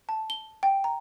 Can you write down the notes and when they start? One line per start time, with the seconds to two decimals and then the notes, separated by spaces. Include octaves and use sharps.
0.09 A5
0.30 G7
0.63 G5
0.84 A#5